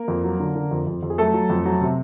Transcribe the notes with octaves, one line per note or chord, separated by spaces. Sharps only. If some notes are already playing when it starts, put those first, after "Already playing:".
Already playing: A#3 A#4
F2
F#3
D3
D3
F2
F2
F2
G#4
F#3 A3 A4
F#3
F2
F#3
C3